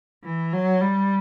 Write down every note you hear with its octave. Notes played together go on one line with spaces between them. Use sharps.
E3
F#3
G3